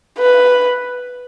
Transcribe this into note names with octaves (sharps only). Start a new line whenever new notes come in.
B4